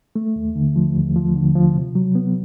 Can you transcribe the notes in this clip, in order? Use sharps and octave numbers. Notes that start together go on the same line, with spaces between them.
A3
D#2
D3
F3
D#2
F3
D3
F3
C3
F#3
B3